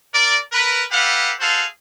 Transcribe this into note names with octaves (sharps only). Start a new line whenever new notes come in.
A#4 D5
A#4 B4
G4 A4 B4 F5 F#5
F#4 G#4 A4 C5 F5